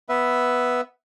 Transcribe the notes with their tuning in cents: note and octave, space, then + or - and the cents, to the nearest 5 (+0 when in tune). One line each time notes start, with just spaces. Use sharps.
B3 +0 B4 +0 E5 +0